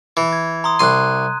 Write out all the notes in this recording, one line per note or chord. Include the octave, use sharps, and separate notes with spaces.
E3
G#6
A#5 C6 D#6
C2 C6 F#6 D#7